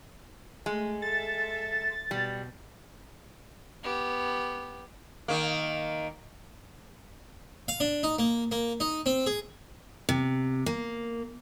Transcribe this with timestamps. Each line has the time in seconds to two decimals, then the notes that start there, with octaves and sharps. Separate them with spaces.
0.66 G#3 A3
1.02 A4 E5 A6
2.11 B2 G3
3.84 B3 G4
5.28 D#3 A#3
7.68 F5
7.80 D4
8.03 D#4
8.19 A#3
8.52 A#3
8.80 D#4
9.06 C4
9.26 G#4
10.09 C3
10.66 A#3